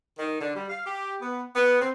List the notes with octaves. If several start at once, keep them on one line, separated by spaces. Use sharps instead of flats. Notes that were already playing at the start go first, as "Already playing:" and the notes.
D#3
D3
G3
F5
G4
B3
B3
C4